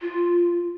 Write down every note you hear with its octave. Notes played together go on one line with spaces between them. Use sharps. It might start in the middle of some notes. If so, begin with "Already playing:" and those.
F4